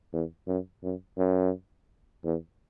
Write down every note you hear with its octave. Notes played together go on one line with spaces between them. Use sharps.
E2
F#2
F#2
F#2
E2